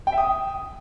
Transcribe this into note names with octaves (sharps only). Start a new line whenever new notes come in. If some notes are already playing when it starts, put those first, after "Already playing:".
G5
E5
D#6